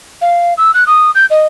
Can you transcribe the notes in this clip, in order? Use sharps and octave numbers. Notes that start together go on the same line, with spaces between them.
F5
E6
F#6
D#6
G6
D#5